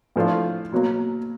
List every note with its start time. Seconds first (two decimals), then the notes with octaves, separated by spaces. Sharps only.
0.16 A2 F3 A3 D4 F4
0.72 B2 F#3 A#3